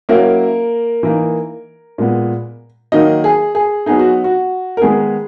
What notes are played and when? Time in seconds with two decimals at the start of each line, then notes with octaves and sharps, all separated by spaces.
0.09 F#3 A#3 C#4 E4 A#4
1.03 E3 A#3 D#4
1.98 A#2 G#3 B3
2.92 D#3 F#3 A#3 D#4 D#5
3.24 G#4
3.55 G#4
3.86 F#3 B3 D#4 G#4
3.99 F#4
4.24 F#4
4.77 A#4
4.81 D#3 G#3 B3 D#4 G#4